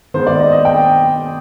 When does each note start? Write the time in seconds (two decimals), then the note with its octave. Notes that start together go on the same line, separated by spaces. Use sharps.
0.14 D#3 G#3 B3 C5
0.27 D5
0.39 D#5
0.52 D#5
0.65 G5